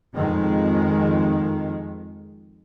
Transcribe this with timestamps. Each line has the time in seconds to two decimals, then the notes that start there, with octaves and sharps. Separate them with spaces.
0.15 F2 D#3 G#3